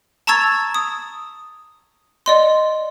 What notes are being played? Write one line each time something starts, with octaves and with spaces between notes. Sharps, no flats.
A5 A#5 C#6 E6 G#6 A6
D#6
D5 D#5 C6